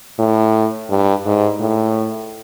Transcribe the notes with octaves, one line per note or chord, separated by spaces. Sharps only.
A2
G2
G#2
A2